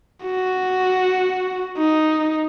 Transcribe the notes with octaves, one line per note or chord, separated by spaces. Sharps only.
F#4
D#4